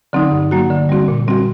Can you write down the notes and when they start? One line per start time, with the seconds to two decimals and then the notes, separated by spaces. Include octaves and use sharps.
0.13 D3 F#3 C4 D#4
0.31 G2
0.51 F#3 A#3 F#4
0.70 D3
0.89 G3 C4 F#4
1.08 A#2
1.28 G3 C4 F#4